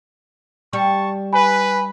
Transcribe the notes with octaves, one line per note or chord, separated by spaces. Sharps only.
G3 A5 C#6
B4 G#5 B5